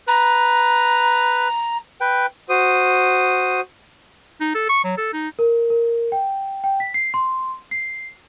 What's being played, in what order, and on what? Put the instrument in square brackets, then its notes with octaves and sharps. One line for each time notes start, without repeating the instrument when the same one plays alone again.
[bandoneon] B4 [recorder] A#5
[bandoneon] B4 G5
[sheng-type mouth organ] F#4 C5 D#6
[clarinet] D#4
A4
C#6
F#3
A4
D#4
[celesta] A#4
A#4
G5
G5
B6
C7
C6
C7